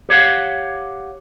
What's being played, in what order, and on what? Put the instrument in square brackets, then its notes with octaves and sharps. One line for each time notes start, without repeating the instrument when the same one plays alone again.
[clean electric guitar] G4 C#5 F5 F#5